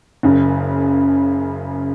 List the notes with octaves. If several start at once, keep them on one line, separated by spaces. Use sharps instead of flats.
F#1 F#2 C#3